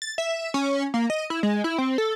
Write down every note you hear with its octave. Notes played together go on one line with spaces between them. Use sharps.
A6
E5
C#4
A#3
D#5
E4
G#3
E4
C4
A4